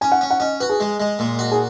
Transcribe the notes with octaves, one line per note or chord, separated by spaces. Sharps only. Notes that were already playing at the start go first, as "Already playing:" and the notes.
C#4 G#5
F#5
C#4
F#5
C#4 D#5
F#4 B4
G#4
G#3
G#3
A#2
F#4
G#4